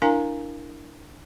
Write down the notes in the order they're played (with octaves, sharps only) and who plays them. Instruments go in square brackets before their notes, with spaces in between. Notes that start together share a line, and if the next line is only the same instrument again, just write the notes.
[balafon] D4 E4 A#4 F5 G#5 A#5